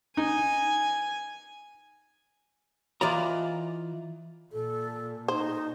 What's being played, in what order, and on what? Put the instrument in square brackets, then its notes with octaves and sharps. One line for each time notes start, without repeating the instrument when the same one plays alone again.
[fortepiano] D#4 [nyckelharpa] G#5
[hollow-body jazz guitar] E3 F4 D5 D#5 A#5
[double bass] A#2 [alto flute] A4
[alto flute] D#4 [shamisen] C5